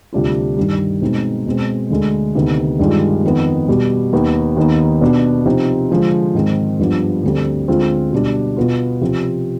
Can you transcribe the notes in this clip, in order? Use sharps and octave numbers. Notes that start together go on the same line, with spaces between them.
D2 C3 G3 D4 F4
G2 D#3 G3
B2 G#3 C4 D#4
B2 G#3 C4
D2 D3 G#3
D2 C3 D#3 B3 D#4
G2 D#3 G#3 D4 F4
F2 D#3 B3
B2 G3 B3
D#2 D#3 B3
D#2 D#3 B3 D#4
B2 B3 D4
C3 F3 C4 D#4
D3 F3 G#3
G#2 D#3 G#3 C4
G2 F3 B3 D4
D2 D3 G3 C4
D2 D3 G#3 C4 F4
B2 G3 D4
B2 B3 F4
C3 F3 C4 F4